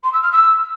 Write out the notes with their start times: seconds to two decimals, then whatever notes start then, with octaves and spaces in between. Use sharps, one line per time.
0.03 C6
0.13 E6
0.22 F6
0.31 E6